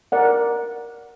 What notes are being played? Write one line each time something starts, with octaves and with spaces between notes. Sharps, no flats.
A#4 D5 F#5